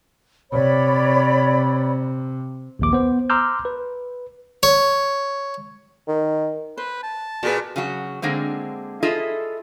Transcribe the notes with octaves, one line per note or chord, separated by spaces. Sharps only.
C3 C#5 D5 B5
A#1 D#2 D6
B3 C5
A#5 C6 D6 E6 F6 G6
B4
C#5
D#3
B4 C5
A5
A#2 F#4 G#4 B4
C#3 F#3 F#4
D3 G#3 A#3 C4
E4 F4 G#4 A4 D#5 E5